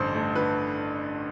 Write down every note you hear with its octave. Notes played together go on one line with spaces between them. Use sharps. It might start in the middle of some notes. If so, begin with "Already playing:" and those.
Already playing: A1 G2 D3 C5
A3
D3 B4